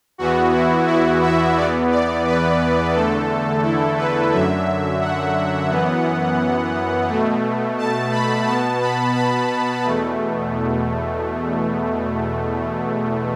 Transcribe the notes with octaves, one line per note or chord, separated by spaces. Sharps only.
E2 E3 B3 F#4
E4
E4
E5
E2 E3 B3 D5
D5
B4
E2 D3 A3 A4
E4
B4
F#2 D3 F#3 E5
F#5
F#2 E3 B3
B2 A3
A5
B5
B2 B3 A5
B5
B5
E2 B2 A3